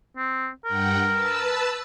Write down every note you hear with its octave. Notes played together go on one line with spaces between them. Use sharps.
C4
G2 A#4 F#5 G5
B4 A5 E6